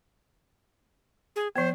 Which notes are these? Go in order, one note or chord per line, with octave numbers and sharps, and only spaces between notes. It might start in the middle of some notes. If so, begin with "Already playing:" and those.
G#4
F3 B3 C5